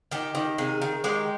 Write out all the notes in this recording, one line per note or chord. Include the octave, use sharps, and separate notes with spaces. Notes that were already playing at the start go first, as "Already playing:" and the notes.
D#3 G4
D#3
C3 G#4
D#3
G#3 G4